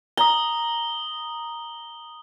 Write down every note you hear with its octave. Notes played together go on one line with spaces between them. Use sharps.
A#5 D#6 G7